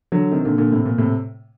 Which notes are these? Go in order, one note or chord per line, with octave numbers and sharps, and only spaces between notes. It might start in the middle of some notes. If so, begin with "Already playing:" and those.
D3 F#3
C3 D#3
A#2 D3
A#2 D3
A2 C3
A#2
A2 C3